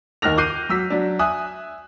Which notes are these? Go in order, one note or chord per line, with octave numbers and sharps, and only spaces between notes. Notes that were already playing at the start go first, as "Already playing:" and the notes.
D#2 D#3 F6 F#6 A#6 F7
D6 F#6 G6 C7 D#7
F#3 E6 B6
F#3 D4
E5 G#5 D#6 F#6